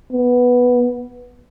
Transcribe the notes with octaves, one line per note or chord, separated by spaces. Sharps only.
B3